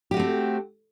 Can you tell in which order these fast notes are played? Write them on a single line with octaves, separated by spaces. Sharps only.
G4 F#4 A3 C4